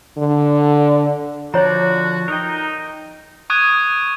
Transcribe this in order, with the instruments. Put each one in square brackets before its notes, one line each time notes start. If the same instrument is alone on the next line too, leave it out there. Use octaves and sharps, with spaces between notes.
[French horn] D3
[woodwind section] D3 F#4 [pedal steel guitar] F3 D5 [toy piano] C#5 A#5
[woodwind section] D#4 [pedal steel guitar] A#4 G5
[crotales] C#6 D#6 F#6 G#6 D#7